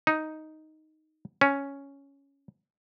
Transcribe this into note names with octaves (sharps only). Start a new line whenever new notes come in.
D#4
C#4